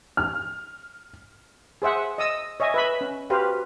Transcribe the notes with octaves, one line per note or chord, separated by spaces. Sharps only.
F6
G#4 C5 E5 F#5
D#5 D#6 E6
C#5 D#5 E5 G#5
B4 E5 B5
C#4
F#4 G4 B4 C5 F5